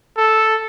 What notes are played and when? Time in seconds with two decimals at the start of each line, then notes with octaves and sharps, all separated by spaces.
0.18 A4